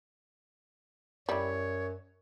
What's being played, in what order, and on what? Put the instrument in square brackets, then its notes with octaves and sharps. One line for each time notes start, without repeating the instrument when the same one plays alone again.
[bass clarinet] F#2 [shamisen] G3 E4 [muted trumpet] C#5